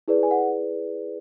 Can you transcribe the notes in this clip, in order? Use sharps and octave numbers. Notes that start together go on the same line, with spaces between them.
E4 G#4 B4 D5
G#5
F#5